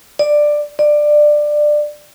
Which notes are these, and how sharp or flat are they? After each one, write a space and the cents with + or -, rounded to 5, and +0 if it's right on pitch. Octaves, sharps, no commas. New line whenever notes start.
D5 +10
D5 +15